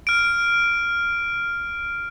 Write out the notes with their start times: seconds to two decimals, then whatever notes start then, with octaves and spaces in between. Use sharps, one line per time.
0.07 F6 D7